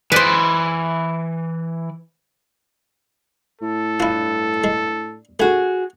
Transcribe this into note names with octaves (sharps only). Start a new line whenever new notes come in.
E3 B4 C5 D5
A2 A4
G2 E4 F4
G#3
A3 F#4 G#4